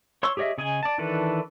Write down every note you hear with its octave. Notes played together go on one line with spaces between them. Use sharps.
C#5 C6 C#6 E6
G4 G#4 C#5 D#5 E5
C#3 G#4 D#5 G#5
D5 A5
D#3 E3 D4 A4 B4